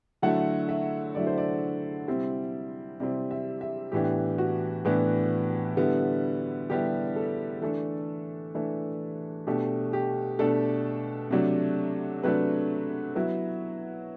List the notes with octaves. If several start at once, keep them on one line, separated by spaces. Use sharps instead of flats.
D3 F#3 A3 E4 F#5
E5
D3 F#3 A3 E4 D5
C5
D5
C3 G3 C4 E4
C3 G3 C4 E4 D5
E5
E5
A2 E3 B3 D4 G4
F#4
A2 E3 B3 D4
D3 G3 B3 E4
D3 G3 B3 E4 G4
A4
E3 A3 D4 A4
E3 A3 D4
B2 A3 D4 G4
G4
B2 A3 D4 A4
C3 F#3 A3 D4
C3 F#3 A3 D4 B4
F#3 B3 E4